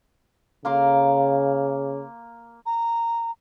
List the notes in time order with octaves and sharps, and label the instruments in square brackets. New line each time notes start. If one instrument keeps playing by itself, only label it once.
[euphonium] C#3 [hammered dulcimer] A#3 C6 D6
[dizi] A#5